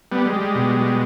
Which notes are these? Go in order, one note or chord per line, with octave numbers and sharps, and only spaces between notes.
G3 B3
G#3
G3
G#3
B2
G3